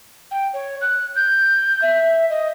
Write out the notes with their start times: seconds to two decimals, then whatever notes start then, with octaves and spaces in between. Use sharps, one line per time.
0.31 G5
0.53 C#5
0.81 F#6
1.15 G6
1.82 E5
2.29 D#5